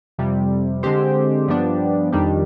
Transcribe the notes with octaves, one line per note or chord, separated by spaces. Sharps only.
F2 C3 G3
D3 G#3 C4 G4 C5
G2 F3 B3 D4 G4
F2 D#3 G3 D4 G4